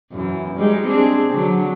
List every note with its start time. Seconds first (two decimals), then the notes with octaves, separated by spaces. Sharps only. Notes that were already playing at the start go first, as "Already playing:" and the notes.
0.11 F#2 E3
0.57 G3 G#3 D#4
0.87 C4 D4 G#4
1.33 D3 F#3